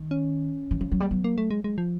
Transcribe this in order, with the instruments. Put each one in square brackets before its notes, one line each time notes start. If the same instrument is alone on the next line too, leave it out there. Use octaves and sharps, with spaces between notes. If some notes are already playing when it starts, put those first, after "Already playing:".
Already playing: [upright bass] D#3
[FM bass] C#4
[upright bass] E3
F3
F#3
[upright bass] G3 [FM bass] A#3
[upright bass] F#3 [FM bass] B3
[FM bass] A#3
A3
G#3
G#3
F3